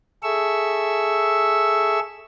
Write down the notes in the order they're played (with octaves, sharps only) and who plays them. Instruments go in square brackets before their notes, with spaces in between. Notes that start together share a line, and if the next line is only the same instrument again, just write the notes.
[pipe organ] G#4 A4 E5 C#6 E6